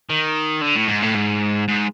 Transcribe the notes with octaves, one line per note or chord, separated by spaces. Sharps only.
D#3
D3
A2
G#2
A2
G#2
G#2